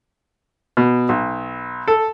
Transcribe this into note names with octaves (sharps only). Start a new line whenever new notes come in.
B2
B1
A4